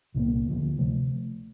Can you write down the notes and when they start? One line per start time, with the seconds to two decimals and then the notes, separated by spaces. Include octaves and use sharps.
0.14 C2 A#2 F3 A#3
0.46 D2 D3 F3
0.78 C3 F3 A3